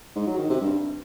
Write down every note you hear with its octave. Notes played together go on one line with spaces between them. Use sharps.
G#2
F#3
D#3
C3
G2